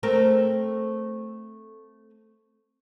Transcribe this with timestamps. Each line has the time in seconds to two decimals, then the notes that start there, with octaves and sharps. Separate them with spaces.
0.03 A3 C4 A#4